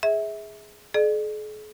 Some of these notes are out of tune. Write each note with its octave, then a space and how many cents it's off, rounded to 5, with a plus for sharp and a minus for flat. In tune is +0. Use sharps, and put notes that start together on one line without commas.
G#4 +0 E5 -25
G#4 +45 D5 +45